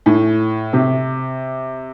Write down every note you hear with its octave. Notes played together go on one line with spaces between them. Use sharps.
A2
C3